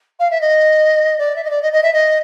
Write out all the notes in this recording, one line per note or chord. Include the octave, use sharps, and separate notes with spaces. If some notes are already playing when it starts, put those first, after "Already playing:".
F5
E5
D#5
D5
E5
D#5
D5
D#5
D#5
E5
D#5